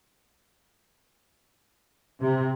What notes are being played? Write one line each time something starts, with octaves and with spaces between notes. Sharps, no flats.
C3